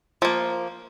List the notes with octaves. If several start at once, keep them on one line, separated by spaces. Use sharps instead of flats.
F3 A#3